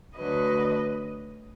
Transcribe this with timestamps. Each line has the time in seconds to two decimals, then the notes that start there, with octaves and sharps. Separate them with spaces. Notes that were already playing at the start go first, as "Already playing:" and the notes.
0.17 D2 D3 F#3 B4 D#5